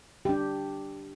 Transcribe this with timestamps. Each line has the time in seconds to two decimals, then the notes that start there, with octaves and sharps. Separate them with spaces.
0.25 D4 G4